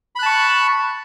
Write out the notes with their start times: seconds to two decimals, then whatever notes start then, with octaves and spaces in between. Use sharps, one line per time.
0.15 B5
0.19 F#6
0.22 A5
0.26 C#6